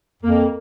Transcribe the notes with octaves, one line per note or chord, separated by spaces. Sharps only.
F2 A#3